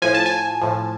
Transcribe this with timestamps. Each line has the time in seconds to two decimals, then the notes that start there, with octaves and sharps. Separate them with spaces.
0.02 A2 F3 G#5
0.15 A5
0.26 G#5
0.61 A2 F3